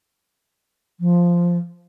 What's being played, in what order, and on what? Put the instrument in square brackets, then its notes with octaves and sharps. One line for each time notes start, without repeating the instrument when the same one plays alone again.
[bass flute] F3